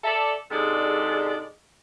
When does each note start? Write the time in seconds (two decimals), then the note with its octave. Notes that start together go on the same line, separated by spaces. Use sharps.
0.04 A4 D5 E5
0.51 G#2 C3 G#3 D4 A4 D5